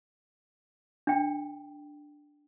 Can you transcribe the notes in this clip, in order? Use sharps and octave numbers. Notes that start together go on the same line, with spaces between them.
D4 G5